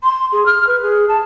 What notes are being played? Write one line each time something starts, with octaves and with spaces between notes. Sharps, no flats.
C6
G#4
F6
B4
G#4
A5